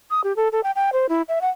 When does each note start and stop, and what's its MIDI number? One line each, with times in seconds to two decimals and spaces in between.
0.10 0.21 87
0.24 0.35 67
0.36 0.48 69
0.52 0.61 69
0.63 0.71 79
0.76 0.90 79
0.93 1.06 72
1.09 1.22 64
1.28 1.41 76
1.41 1.49 78